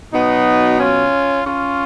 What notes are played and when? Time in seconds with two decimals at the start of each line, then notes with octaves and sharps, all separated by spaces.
0.13 B2 F#3 B3 D#4
0.80 C#4 F4
1.46 C#4 F4